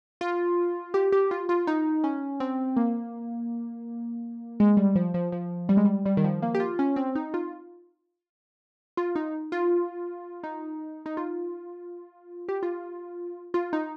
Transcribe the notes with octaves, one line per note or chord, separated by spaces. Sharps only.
F4
G4
G4
F4
F4
D#4
C#4
C4
A#3
G#3
G3
F3
F3
F3
G3
G#3
G3
G3
D#3
F3
A#3
G4
F4
C#4
C4
D#4
F4
F4
D#4
F4
D#4
D#4
F4
G4
F4
F4
D#4